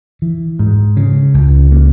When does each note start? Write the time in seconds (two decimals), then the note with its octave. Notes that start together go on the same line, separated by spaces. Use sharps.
0.22 E3
0.59 G#2
0.97 C#3
1.34 C#2
1.72 A#3